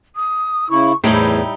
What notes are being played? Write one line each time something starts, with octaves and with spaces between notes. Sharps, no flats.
D#6
C#3 E4 C#6
E2 A2 G3 D#4 E4 C5